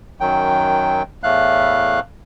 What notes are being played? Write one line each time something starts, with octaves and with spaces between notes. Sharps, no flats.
F#2 D#3 F#3 G5
E2 A2 A3 F5 F#6